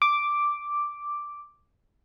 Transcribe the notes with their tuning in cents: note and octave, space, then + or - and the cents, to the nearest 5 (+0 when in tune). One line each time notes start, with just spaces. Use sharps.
D6 +0